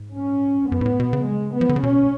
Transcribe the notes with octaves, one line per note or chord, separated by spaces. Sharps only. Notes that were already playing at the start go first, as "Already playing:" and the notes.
Already playing: G#2
C#4
F#2 B3
G#2
A2
B2
C#3
G#3
B3
F3
D3
C#3
B2 C#4